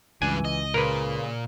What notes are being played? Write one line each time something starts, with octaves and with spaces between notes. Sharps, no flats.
C#2 G2 E3 D4 G#5
D#5
A#2 C#3 A#4 B4